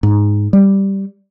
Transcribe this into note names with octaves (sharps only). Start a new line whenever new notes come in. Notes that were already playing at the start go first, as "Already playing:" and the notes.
G#2
G3